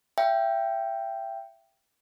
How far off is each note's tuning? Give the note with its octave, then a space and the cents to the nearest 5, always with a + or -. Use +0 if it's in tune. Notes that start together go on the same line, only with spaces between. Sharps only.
E5 +30 G5 +0